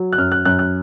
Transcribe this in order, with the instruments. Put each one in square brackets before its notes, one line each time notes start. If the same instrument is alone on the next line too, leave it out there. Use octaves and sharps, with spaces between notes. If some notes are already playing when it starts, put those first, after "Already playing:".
Already playing: [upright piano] F#3
F#6
F#2 F6
F#6
F#2 F#6
F#6